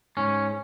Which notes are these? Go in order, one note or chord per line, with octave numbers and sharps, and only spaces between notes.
G#2 C#4